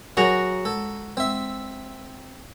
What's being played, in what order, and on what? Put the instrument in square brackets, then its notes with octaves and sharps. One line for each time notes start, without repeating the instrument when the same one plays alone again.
[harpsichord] F#3 G#4 [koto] F#4 A#5 [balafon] A#4 C#5
[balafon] G#3 [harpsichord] A4
[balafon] G#3 [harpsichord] C4 E5